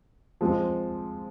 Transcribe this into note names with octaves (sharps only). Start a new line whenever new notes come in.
F3 G#3 C4